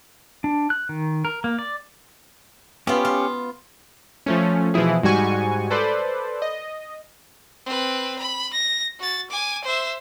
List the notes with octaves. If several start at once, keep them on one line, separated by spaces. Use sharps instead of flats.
D4
F#6
D#3
A#4
A#3
D5
B3 C#4 F4 G4
F4
F3 A3 C#4
B2 E3 F3 E4 G#4
G#2 G3 F#4 G#5 C#6
A4 B4 C5 D5
D#5
C4 B4
B5
A#6
F#4 A6
G#5 D6
C5 E5